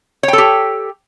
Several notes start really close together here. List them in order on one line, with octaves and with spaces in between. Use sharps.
C#5 G5 A4 G4